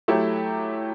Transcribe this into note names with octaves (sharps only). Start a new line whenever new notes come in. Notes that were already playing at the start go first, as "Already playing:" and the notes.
F#3 A3 E4 G4